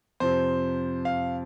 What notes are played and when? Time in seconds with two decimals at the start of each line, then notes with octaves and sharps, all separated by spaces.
0.20 F2 C3 F3 C5
1.05 F5